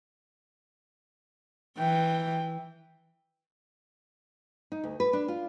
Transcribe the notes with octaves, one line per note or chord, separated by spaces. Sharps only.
E3 G5
D#4
D2
B4
D4
F4